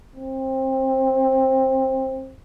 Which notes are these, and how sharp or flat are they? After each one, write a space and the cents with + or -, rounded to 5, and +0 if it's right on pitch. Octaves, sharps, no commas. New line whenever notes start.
C4 +20